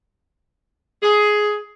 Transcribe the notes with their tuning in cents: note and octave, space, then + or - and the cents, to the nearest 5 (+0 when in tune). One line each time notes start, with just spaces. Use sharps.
G#4 +10